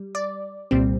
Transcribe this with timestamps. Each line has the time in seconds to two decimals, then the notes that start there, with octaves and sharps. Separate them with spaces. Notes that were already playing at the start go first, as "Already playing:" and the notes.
Already playing: G3
0.15 D5
0.71 C2 A#2 G3 C4